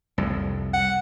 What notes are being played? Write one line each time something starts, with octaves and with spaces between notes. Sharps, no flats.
C2 F2
F#5